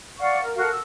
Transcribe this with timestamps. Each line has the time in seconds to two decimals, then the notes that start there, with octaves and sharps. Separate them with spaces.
0.19 D5 F5 F#5 C#6
0.41 A#4
0.56 F#4 A4 A#4 F5
0.69 E6